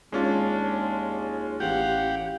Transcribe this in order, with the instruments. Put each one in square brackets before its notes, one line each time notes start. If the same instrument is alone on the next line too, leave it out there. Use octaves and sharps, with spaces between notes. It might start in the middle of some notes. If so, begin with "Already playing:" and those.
[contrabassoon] D#2 [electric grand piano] G#3 C#4 F4 [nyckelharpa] D4
[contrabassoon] A1 [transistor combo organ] G4 [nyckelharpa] F5 F#5